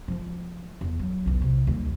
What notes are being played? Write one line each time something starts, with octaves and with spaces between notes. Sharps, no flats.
F3 G#3
E2
F#3
B1 E2
C3
D#2 G3